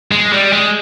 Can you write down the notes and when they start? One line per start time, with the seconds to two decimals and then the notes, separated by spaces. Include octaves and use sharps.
0.12 G#3
0.33 G3
0.53 G#3